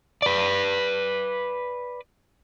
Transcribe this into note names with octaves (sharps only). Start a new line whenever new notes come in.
B4 D5